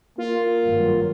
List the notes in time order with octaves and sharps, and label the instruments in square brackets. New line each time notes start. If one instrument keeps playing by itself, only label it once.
[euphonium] A#3 [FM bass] F4
[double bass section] G#1 G2 F#3